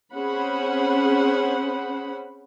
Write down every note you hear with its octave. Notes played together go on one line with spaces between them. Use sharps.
C4 C#4 G#4 C5 F#5 B5